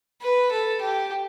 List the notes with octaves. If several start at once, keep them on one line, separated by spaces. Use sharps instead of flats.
B4
A4
G4